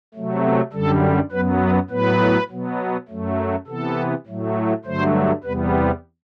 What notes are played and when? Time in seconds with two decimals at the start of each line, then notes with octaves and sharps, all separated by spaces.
0.14 C3 F#3 A3
0.44 B3
0.73 F#2 D3 G3 A4
1.32 F#2 F#3 B3 B4
1.62 B4
1.90 A2 F#3 B3 B4
2.50 B2 F#3 B3
3.09 F#2 F#3 A3
3.67 C3 E3 B3 A4
4.27 A2 F#3 A3
4.85 G2 D3 F#3 A3 C5
5.44 E2 C3 G3 B3 B4
5.73 G4